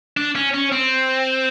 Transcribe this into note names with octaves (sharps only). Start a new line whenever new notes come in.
D4
C#4
C#4
C4